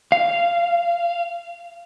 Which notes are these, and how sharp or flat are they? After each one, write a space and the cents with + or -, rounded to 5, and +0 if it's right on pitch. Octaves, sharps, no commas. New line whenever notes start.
F5 -15